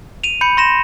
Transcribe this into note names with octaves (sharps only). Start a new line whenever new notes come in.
D#7 F7
B5 G6 C#7
C6 A#6 E7